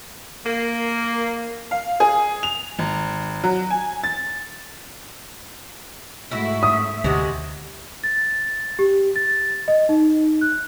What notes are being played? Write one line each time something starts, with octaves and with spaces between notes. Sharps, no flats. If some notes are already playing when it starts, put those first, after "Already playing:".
A#3
F5
G#4
F7
G#1
F#3
G#5
A6
G#2 A3 E4 F#4 E5
D#6
D2 C3 G#3 F#4
A6
G4
A6
D#5
D#4
F#6